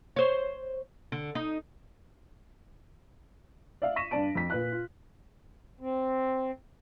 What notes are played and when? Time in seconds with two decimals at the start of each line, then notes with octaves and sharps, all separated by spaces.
0.16 C5 C#5
1.12 D3
1.35 D#4
3.82 D5 E5 F5
3.96 C#6 A#6 B6 D#7 E7
4.11 G2 D4 D5 A5 D7
4.35 F2 B6
4.50 A#2 B4 F#6
4.72 F4
5.80 C4